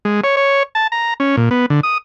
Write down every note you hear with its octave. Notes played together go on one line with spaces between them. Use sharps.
G#3
C#5
C#5
A5
A#5
C#4
A#2
B3
D3
D#6